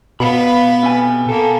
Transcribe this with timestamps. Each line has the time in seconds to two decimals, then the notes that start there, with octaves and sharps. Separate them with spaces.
0.20 B2 B3 B4 F5 B5
0.83 C3 G#5
1.29 A#3 B3 A4